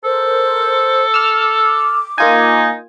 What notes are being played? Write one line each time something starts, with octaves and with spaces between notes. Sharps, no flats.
A4 A#4 C5
D6 E6 F6
A#3 D#4 F4 G#5